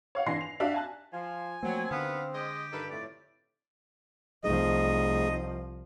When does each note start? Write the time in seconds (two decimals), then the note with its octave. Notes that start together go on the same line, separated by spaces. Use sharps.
0.15 C#5 F5 F#5
0.26 E3 D4 G#5 C6 A#6 C7
0.41 F7
0.60 D4 F#4 G4 E5 F5
0.74 G#5 A5 F#6
1.13 F3 F4 G#5
1.63 F3 F#3 A3 A#3 C4
1.91 D#2 D3 B3 F5
2.34 G#3 G4 D#5
2.73 G2 D#3 A4 B4
2.90 F2 A2 D5
4.44 C2 F3 A3 D#4 G#4 D#5